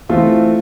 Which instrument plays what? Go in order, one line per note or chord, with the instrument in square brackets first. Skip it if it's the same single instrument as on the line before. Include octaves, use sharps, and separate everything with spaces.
[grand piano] E3 A3 C4 F4